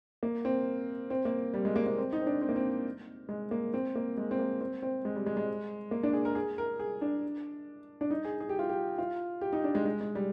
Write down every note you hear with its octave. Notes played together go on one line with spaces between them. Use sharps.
A#3
C4
C4
A#3
G3
G#3
A#3
A#3
C4
D#4
C4
D4
C4
A#3
C4
G#3
A#3
C4
A#3
G#3
C4
A#3
C4
C4
G#3
G3
G#3
G#3
A#3
D4
G#4
A#4
G#4
A#4
G#4
D4
D4
D#4
G#4
G#4
G4
F4
G4
F4
G4
D#4
D4
G#3
G#3
G#3
G3